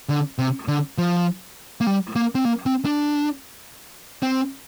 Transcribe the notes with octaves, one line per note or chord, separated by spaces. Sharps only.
D3
C3
D3
F3
A#3
G3
A#3
C4
A#3
C4
D4
C4